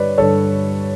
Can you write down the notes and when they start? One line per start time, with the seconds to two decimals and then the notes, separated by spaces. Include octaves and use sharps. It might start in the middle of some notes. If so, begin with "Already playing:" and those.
Already playing: G2 D3 G3 B4 C#5 D5
0.17 G2 D3 G3 A4 C#5